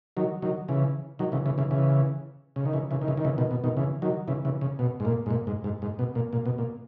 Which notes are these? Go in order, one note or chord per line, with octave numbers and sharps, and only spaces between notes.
D#3 F#3
D#3 F#3
C#3 E3
D#3 F#3
C#3 E3
C#3 E3
C#3 E3
C#3 E3
C#3
D#3
C#3 E3
C#3 E3
D#3
C#3 E3
D#3
C#3 E3
B2 D#3
B2
B2 D#3
C#3 E3
D#3 F#3
C#3 E3
C#3 E3
C#3
B2
G#2
A#2
G#2
A#2
G#2
G#2
G#2
B2
A#2
A#2
B2
A#2